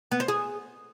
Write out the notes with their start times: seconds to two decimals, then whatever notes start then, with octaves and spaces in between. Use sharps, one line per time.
0.12 B3
0.20 C5
0.28 G#4